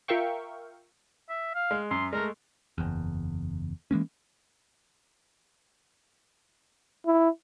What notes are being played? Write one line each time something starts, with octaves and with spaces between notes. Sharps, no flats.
F4 A#4 E5 F5 G5 C#6
E5
F5
G#3
F#2 C6
G#3 A3 A#4
F#1 E2
E3 G#3 A#3 C#4
E4